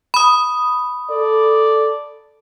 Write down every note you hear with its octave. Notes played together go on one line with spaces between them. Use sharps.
B5 D#6
A4 D5